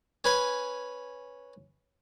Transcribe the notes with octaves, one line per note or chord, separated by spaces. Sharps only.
C#4 B4 G#5